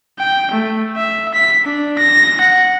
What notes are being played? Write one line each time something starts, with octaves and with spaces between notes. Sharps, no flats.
G5
A3
E5
B6
D4
A#6
F#5